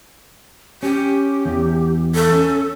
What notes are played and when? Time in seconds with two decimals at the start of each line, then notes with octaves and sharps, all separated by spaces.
0.83 C#4 G4
1.46 E2
2.15 A4
2.32 C#4